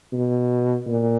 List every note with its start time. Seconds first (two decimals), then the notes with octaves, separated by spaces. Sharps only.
0.13 B2
0.87 A#2